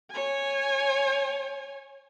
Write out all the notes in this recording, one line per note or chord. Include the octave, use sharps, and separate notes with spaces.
C#5 G#5